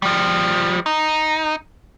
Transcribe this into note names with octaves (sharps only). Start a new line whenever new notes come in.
F3 G3
D#4